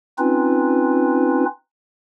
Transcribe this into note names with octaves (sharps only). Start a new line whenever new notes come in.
C4 C#4 D#4 F4 B4